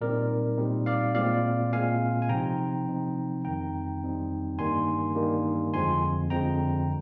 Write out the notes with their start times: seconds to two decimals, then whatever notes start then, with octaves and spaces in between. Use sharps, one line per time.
0.01 A#2 G3 C4 D#4 A#4 D5
0.58 A#2 G3 C4 D#4
0.86 D5 F5
1.15 A#2 G#3 C4 D5 F5
1.72 A#2 G#3 C4 F5 G#5
2.22 G#5
2.29 C3 F3 C4 D#4 G5 A#5
2.88 C3 F3 C4 D#4
3.44 F2 D#3 G3 C4 D#4 G5 A#5
4.01 F2 D#3 G3 C4 D#4
4.58 G2 D#3 G3 A#3 D#4 G#5 C6
5.15 G2 D#3 G3 A#3 D#4
5.73 F2 D3 F3 G#3 C4 G#5 C6
6.30 F2 D3 F3 G#3 C4 G5 A#5